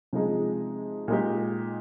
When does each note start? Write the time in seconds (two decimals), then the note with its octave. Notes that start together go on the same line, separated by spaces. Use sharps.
0.13 C3 F3 G#3 D#4 G#4
1.08 A#2 G#3 D#4 G4